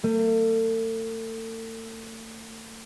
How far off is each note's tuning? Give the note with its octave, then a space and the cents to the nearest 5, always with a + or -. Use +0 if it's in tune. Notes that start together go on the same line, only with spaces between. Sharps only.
A3 +40